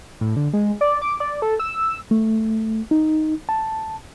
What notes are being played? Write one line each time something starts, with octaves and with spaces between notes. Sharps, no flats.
A2
D3
G#3
D5
D6
D5
A4
E6
A3
D#4
A5